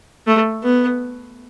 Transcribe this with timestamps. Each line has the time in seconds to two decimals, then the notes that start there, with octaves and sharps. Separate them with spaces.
0.27 A3
0.63 B3